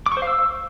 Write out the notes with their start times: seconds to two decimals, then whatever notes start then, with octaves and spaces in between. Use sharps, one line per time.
0.06 D6
0.12 C#6
0.17 C5
0.22 F5
0.27 E6